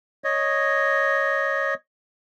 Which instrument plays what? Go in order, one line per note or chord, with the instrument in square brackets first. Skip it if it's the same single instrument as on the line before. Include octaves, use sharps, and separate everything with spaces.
[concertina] C#5 D#5